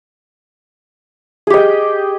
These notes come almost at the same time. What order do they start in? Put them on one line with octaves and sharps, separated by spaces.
G#4 G4 D#5 G5